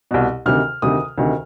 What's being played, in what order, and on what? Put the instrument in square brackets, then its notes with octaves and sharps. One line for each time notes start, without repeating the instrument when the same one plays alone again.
[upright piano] C2 B2
D2 C3 D#3 F6
D2 C3 D#3 D#6
D2 C3 D#3